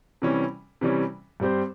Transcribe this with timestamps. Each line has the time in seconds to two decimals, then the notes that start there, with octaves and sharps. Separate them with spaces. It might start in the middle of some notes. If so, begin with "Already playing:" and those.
0.22 C3 E3 G3 C#4
0.81 C3 E3 G3 C#4
1.40 G2 G3 C4 G4 C5